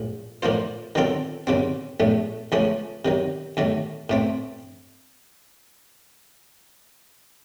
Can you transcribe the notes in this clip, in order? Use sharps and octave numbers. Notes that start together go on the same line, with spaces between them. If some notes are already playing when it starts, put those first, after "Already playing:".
Already playing: A#1 A2 F3
A2 F3 A#3 F4 C5
D#3 F#3 C4 F4 A4
D#2 C#3 F#3 C4
A#1 A2 A3
C#2 C#3 F3 A3 C#4
C3 D#3 F#3
D#2 D#3 F#3 A3
A2 A3 C4